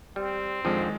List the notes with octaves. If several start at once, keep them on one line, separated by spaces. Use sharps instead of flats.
G3 C4
F2 D3 D#3 F3 G#3